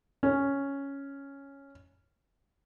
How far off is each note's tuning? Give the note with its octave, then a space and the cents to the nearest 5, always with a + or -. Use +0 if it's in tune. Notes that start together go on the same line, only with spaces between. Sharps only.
C#4 +0